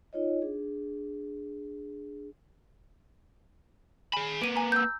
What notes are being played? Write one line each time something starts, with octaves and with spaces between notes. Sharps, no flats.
D#4 F4 C#5 D#5
D4 G#4
G#4 G#5 B5 E7
A#3 B4 D7 D#7
G#5 A#5
E6 G6